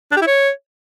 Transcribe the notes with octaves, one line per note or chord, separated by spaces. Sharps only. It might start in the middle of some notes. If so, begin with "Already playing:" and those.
D4
G4
E4
C#5